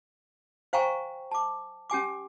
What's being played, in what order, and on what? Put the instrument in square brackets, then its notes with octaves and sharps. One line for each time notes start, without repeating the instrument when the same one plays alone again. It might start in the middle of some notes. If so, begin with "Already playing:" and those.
[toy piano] C5 F5 G5 G#5 A#5 C#6
A5 D6
C#4 G4 G#5 D6